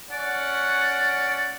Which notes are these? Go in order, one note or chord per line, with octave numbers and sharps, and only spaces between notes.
C#4 D5 F#5